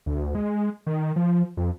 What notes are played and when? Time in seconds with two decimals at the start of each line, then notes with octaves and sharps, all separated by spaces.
0.06 D2
0.35 G#3
0.86 D#3
1.16 F3
1.57 F2